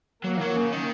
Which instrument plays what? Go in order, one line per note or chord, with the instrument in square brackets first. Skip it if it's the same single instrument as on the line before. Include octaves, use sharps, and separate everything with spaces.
[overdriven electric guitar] F#3 [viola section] A#3
[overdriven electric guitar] E3
F#3
C#3
D#3